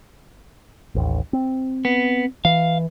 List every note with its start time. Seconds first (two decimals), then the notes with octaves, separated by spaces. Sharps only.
0.95 A1 D#2
1.33 C4
1.85 B3
2.45 E3 F5